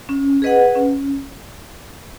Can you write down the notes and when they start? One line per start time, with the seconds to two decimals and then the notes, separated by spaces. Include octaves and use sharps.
0.09 C#4
0.42 G#4 B4 D#5 F#5
0.75 C#4